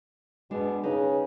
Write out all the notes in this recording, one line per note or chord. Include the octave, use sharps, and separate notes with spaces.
B2 G#3 D4
C#3 D#4 B4